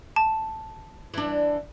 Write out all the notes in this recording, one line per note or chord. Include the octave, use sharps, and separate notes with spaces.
A5
E3 D4